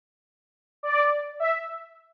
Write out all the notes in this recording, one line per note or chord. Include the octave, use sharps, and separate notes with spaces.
D5
E5